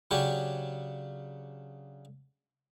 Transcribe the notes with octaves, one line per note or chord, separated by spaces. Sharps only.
C#3 F#3 C#4 D4 G4 C#5